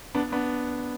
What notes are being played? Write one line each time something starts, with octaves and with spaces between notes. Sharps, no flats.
B3 D4
B3 D4